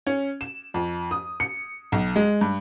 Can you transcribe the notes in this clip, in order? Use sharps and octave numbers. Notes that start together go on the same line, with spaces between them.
C#4
E7
F2
D#6
C#7
B1
G#3
G2